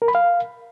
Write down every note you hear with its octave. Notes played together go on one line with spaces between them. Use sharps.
A#4
B5
F5